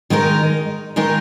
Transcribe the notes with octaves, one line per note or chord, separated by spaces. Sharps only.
D#3 G#3 D#4 A#4
D#3 G#3 D#4 A#4